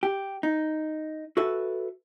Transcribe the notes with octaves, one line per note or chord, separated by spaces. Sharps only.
G4
D#4
F#4 A4 B4 E5